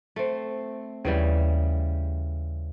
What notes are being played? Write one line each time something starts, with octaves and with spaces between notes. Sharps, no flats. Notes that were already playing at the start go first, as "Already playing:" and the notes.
A3 C4
D#2 C#3 E3 G3